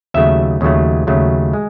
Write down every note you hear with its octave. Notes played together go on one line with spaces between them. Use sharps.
D#2 C#3 F#3 A3 E5
D#2 C#3 F#3 A3
D#2 C#3 F#3 A3
G#3